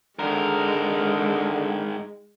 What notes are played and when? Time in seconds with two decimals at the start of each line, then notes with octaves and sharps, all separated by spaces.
0.19 G#2 D3 G#3 A#4